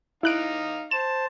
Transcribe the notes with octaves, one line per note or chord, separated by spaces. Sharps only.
D#4 E4 F5 F#6 D7
C5 A5 E7